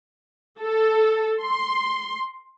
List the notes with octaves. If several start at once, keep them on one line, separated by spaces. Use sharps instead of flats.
A4
C6